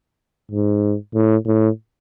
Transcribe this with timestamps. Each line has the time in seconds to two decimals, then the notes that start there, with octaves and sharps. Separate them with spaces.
0.51 G#2
1.14 A2
1.46 A2